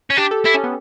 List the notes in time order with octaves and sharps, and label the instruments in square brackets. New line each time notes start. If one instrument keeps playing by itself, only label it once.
[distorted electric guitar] C#4
[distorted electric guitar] D4 [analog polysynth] G4
[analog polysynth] A4
[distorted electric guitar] E4 [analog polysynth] A4
[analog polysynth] C#4
B3